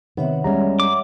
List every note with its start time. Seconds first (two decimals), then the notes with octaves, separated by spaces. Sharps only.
0.17 C3 D#3 B3 C#5 E5 F#5
0.44 E2 G3 G#3 C#4 A#5
0.80 D6